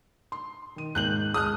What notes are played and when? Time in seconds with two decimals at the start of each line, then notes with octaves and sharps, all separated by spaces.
0.32 C6
0.76 D#3 D#7
0.95 D#2 G#2 F#6 G6 F#7
1.34 G#3 A5 D#6 F6 F#6